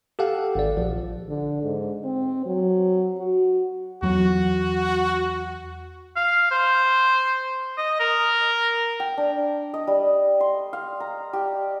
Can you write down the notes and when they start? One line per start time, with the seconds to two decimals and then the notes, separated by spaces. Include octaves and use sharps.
0.19 G4 A4 F5 F#5
0.55 G#1 D5
0.77 A#1 F3
1.29 D3
1.63 G#2
2.04 C4
2.46 F#3
3.19 F#4
4.03 E2 F#3 F#4
6.17 F5
6.51 C5
7.77 D#5
8.00 A#4
9.00 G5
9.18 D4
9.74 D#5
9.87 G3
10.40 C6
10.73 F5
11.00 A#5
11.33 G4